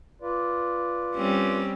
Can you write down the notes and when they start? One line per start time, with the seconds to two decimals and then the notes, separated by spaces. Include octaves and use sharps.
0.21 F4 B4 D5
1.15 G3 C4 C#4